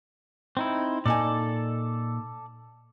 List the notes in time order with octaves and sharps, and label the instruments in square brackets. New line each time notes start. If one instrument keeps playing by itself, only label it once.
[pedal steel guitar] C4 D#4 E4
[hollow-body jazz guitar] A#2 D#4 G#5 [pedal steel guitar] A4 D5